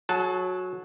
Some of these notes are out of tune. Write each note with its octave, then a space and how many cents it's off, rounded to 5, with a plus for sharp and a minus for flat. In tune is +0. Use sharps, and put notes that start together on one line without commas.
F#3 -15 G#4 +40 A5 +0